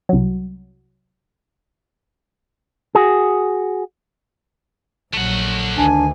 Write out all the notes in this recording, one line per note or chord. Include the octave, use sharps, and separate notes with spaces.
C2 F#3
F#4 G#4
A#1 F#3 A3 F#5
D2 D#3 D4 G#5